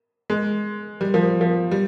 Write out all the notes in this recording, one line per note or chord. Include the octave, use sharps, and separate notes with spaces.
G#3
G3
F3
F3
G3